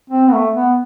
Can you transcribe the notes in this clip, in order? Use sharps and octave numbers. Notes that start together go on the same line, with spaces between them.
C4
B3
A3
B3